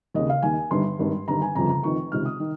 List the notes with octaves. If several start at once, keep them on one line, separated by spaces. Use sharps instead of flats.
D#2 C#3 D#5
F5
D#2 D#3 G#5
G1 G2 D#3 C6
G#1 G2 D#3
G1 G2 D#3 A#5
G#5
G1 F2 C#3 A#5
A#5
F1 F2 D#3 C#6
C#2 C3 D#3 F6
D#6
D#3